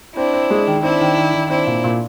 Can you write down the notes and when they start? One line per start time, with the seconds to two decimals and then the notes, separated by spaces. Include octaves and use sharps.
0.16 C4 D4 E4
0.33 C4
0.50 G#3
0.67 D#3
0.83 C4 D4 E4
1.01 D#3
1.17 D#3
1.34 D#3
1.50 C4 D4 E4
1.67 A#2
1.84 A#2